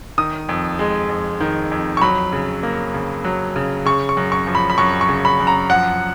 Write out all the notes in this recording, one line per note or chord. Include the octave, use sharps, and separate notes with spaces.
D#3 D#6
F2
G#3
F2
D#3
F2
C#6
F#3 B5
C#3
A#3
C#3
F#3
C#3
C#3 C#6
C#6
F#2
C#6
F3
B5
B5
F#2 C#6
C#6
C#3
B5
F#2
A#5
F3 F#5